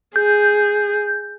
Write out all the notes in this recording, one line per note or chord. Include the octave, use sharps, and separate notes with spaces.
G#4 G6